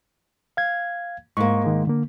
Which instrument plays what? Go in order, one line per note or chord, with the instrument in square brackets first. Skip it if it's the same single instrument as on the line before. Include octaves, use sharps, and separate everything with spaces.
[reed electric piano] F5 G#6
[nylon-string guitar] G#2 A#3 [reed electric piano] C#6
[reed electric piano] D#3 G#3
D3 A#3